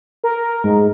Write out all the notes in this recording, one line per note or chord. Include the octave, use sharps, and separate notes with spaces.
A#4
G#2